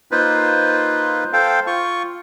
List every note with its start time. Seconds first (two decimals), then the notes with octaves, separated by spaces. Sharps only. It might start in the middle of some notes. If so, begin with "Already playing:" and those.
0.11 A#3 D#4 F4 B4 C5
1.33 A4 C5 F5 G5
1.67 F4 C#6